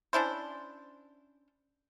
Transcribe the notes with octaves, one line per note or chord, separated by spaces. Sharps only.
C#4 D4 E4 C5